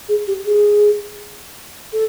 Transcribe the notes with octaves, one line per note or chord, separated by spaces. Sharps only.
G#4
G4
G#4
A4